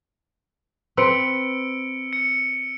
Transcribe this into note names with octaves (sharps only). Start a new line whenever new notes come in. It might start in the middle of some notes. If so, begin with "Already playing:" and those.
C4 B4 E6 C#7 D7
C#7